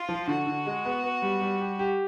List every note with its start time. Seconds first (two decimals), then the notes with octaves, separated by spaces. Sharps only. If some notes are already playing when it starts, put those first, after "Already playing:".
Already playing: F4
0.09 F3
0.27 D3 F#4
0.47 D3
0.66 G#3
0.85 B3
1.04 B3
1.22 G3
1.41 G3
1.61 G4
1.79 G4